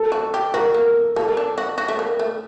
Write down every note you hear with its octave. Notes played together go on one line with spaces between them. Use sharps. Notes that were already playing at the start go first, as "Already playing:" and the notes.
Already playing: A4
F#4
G4
F#4 A#4
A#3
A#3 A4
D4
F#4
F#4
A3
A#3
A3